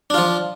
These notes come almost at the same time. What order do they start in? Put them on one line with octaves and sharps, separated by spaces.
D4 F4 F3